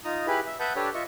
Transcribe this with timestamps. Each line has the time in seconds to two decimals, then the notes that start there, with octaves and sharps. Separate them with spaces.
0.05 D#4 F4 A#5 D#6
0.27 E4 G4 G#4 B4 B5
0.46 E5
0.60 B4 E5 F#5 A5 D#6 G6
0.76 D4 G4 A4 B4 C#5 D5
0.94 F4 D#5 E5 C#6